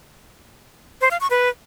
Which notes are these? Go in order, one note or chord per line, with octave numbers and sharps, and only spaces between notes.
C5
F5
C#6
B4